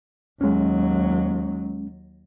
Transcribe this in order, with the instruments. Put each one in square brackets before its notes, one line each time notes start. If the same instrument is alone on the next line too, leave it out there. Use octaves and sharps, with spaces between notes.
[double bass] D#2 F#3 [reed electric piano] G#3 C#4